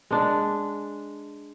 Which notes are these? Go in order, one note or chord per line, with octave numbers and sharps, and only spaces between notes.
G#3 D4